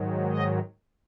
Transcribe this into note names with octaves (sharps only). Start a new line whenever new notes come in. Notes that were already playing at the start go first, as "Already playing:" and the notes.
Already playing: G#2 D#3 F#3
D#5